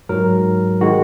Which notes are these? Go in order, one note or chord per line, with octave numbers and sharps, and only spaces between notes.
G#2 F#3 A#4
D#3 G#3 F#4